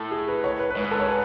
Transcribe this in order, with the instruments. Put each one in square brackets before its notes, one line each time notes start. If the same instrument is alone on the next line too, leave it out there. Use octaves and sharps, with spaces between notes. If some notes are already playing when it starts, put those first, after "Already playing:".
Already playing: [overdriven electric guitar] A2 [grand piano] A4
[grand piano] G#4
B4
C#5
B4
B4
[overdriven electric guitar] G#2 [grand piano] C#5
[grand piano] B4
A4
C#5
B4